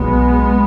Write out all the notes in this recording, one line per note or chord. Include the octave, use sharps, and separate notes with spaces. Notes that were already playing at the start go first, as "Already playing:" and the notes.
Already playing: B1 B2 G#3 B3